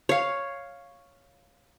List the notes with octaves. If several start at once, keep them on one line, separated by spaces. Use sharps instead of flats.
C#5 F5